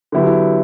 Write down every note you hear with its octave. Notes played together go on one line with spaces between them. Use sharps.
D3 F#3 B3 E4 G4